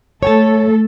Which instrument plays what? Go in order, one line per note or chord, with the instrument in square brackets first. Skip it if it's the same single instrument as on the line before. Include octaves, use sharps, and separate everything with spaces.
[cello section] A3 A4 [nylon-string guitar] C#5 G5 A5